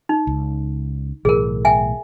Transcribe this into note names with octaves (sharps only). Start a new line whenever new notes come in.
D#4
C#2
B1 A2 E3 G#4 A#4
E5 G5 G#5